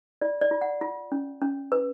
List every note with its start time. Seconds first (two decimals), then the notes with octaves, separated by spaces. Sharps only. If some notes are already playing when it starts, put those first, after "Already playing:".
0.21 F4 D5
0.41 D5
0.51 F4
0.61 F#5
0.81 F4
1.12 C#4
1.42 C#4
1.72 B4